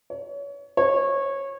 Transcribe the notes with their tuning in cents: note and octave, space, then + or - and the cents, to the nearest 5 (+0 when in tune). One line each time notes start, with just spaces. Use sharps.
C#5 +30
C#5 -20